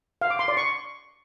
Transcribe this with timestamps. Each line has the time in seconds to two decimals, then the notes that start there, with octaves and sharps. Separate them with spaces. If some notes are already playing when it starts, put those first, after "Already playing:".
0.21 F5
0.30 D6
0.39 C6
0.48 D5
0.57 C#6